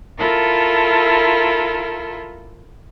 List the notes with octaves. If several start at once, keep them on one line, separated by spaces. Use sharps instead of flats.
E4 F4 A4 A#4